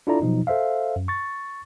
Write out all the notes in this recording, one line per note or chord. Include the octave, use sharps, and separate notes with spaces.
D4 E4 F4 A4 D5 A#5
B2 F3 F#3 D#4
A4 C5 E5 F5
F#2
C#6 A6